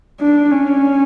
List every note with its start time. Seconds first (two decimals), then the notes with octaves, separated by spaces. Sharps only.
0.20 D4
0.51 C#4